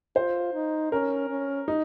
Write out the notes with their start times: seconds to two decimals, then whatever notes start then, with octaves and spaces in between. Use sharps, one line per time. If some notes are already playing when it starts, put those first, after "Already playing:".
0.16 F4 C5
0.54 D#4
0.92 C#4 A#4
1.30 C#4
1.68 D#4